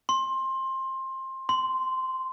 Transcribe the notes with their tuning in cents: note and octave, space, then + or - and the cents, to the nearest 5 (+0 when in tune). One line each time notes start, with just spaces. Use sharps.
C6 +20
C6 -10